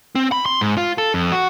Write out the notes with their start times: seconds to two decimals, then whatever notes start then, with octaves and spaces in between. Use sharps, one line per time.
0.15 C4
0.32 B5
0.46 C6
0.61 G#2
0.77 F4
0.98 A4
1.14 F2
1.32 F#4